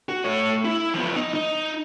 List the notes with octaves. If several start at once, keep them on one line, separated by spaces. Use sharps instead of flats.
F#4
A3 C#5
E4
F3 B3
D#4
D#4